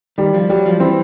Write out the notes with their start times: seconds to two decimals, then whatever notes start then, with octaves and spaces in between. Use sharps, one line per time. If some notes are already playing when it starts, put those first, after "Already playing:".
0.18 D#3 G3
0.34 F3
0.49 F#3 G3
0.66 F3
0.80 E3 C4